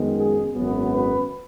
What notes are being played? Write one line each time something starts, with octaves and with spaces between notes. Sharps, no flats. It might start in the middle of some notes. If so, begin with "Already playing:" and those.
Already playing: F#2 D#3 G#3 B3
G#4
G#1 F#2 F#3 B3
B4